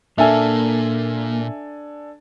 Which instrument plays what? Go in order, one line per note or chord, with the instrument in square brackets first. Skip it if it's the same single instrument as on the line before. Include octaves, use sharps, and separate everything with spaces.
[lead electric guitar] A#2 [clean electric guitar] A#3 [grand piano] D4 A4 G#5 [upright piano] E5